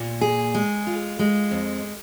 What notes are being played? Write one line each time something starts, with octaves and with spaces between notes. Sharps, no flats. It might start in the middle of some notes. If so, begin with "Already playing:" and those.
Already playing: A#2
G#4
G#3
F4
G#3
F2